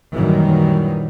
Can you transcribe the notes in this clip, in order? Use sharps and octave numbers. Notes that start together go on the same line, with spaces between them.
F#2 A#2 D#3 E3 F#3 G3